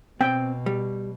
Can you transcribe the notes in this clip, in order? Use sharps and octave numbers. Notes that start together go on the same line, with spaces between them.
B2 C4 G5
G3